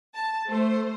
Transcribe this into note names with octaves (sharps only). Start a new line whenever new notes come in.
A5
A3 C5